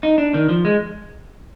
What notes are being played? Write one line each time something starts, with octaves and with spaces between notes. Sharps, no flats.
D#4
D4
D#3
F3
G#3